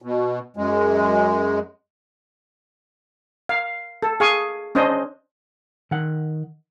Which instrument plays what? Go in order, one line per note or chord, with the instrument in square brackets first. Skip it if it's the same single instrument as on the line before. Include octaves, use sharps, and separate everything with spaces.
[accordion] B2
F#2 G#3
[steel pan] F5
A4
G#4 F5 G#5 C#6
C#4 D4 C5 D#5
[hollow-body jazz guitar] D#3 F#5